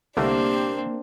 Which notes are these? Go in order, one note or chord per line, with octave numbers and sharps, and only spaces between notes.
C2 D3 A3 A#3 C4 D4 G4